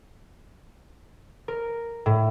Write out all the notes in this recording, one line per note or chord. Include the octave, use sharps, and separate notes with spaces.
A#4
A2